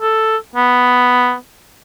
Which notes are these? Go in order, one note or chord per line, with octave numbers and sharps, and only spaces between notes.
A4
B3